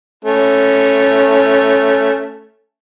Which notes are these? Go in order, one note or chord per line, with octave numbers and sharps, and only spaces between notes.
A3 C#4